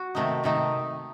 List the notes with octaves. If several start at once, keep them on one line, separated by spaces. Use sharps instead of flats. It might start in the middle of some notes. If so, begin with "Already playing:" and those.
Already playing: F#4
C3 D#3 A3 D#4
C3 D#3 A3 D#4